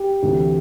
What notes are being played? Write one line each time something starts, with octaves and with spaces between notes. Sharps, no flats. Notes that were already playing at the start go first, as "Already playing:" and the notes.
Already playing: G4
D2 C3 E3